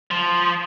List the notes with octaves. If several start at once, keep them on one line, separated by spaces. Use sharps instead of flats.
F3